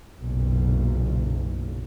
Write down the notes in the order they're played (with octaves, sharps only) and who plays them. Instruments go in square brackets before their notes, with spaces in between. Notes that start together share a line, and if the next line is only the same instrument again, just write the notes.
[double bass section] F#1 B1 A#2